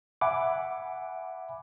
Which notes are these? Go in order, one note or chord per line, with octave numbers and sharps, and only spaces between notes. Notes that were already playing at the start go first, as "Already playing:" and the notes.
E5 F#5 G#5 B5 D6